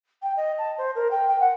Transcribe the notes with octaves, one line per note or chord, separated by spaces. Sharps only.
G5
D#5
A5
C5
A#4
G5
G5
F#5